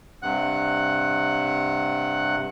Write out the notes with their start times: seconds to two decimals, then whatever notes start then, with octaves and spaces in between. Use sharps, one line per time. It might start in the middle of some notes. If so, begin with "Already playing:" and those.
0.22 G2 C3 F#5 F#6